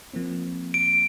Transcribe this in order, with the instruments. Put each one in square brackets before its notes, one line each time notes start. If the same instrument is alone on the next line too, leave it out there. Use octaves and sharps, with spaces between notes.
[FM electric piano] F3 A#3 C4
[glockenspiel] D7